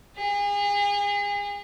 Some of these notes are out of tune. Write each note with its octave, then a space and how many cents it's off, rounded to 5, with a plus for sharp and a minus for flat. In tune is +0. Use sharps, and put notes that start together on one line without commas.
G#4 -35